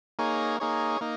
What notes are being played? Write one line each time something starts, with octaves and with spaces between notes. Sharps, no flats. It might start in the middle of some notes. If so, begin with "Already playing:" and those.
A#3 D#4 G#4 C#5
A#3 D#4 G#4 C#5
A#3 D#4